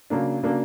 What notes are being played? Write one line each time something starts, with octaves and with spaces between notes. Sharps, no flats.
C#3 F#3 A#3 D4
C#3 F#3 A#3 D4